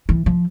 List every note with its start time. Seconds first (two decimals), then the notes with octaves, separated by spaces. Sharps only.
0.09 E3
0.26 F3